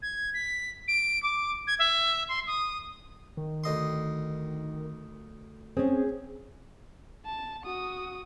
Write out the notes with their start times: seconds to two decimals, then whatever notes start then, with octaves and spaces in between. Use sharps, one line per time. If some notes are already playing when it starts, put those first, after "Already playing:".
0.02 G#6
0.34 B6
0.88 D7
1.23 D6
1.67 G#6
1.79 E5
2.29 C6
2.47 D#6
3.37 D#3
3.64 D2 D#5 C6
5.77 C4 C#4 G#4
7.26 A5
7.64 F#4 D#6